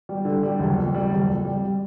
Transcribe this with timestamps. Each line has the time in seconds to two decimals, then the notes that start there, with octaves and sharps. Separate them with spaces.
0.09 G3
0.25 D3
0.43 G3
0.59 F#1
0.77 F2
0.94 G3
1.11 F#1
1.28 F2
1.45 G3